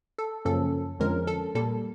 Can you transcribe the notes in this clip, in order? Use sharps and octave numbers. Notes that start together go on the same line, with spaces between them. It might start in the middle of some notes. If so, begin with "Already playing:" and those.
A4
F#2 C#3 F3 A#3 C#4 A4
F2 D3 F3 G#3 C#4 A#4
A4
A#2 G3 A#3 A4